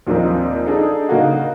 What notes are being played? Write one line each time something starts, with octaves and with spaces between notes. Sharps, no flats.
D#2 A#2 F3 C4 D#4
D4 D#4 G#4 A4
C#3 A#3 D#4 F#4